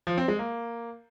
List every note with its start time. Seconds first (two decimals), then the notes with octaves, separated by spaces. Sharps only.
0.07 F3
0.17 C4
0.28 G#3
0.39 A#3